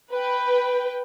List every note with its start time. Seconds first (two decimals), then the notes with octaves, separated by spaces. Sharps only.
0.11 B4 G5